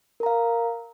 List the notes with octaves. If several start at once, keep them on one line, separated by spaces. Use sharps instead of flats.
A#4 F5 A#5